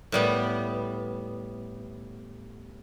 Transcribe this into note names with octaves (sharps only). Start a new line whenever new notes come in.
A2 G3 B3